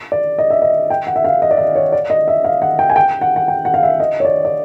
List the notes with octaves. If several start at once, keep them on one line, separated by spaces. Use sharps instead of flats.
D5
D#5
E5
D#5
G5
F#5
E5
F5
D#5
D5
D#5
C#5
D5
D#5
E5
F5
F#5
G5
G#5
G5
F#5
F#5
G5
F#5
F5
E5
D#5
C#5
D5
D5